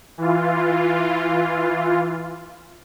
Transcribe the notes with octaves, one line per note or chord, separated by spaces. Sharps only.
E3 F4